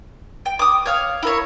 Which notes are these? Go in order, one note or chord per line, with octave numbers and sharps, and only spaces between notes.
G5
D6 D#6
C#5 F5 F6
E4 A#4 C#5